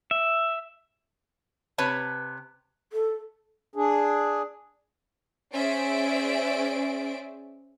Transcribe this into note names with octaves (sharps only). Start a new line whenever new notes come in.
E5
C3 B4 C#5 A5
A4
D4 G#4
C#4 G#4 C5 D5 E5 D7